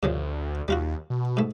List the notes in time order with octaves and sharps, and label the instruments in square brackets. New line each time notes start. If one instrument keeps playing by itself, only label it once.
[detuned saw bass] D2 [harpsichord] G2 C#3 F3
[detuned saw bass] D#2 [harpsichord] G3 F4 F#4
[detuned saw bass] B2
[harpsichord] G#2 A3